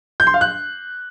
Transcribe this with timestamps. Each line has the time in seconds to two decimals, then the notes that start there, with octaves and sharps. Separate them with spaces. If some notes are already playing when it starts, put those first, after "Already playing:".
0.20 G6
0.27 C6
0.34 F5
0.41 F#6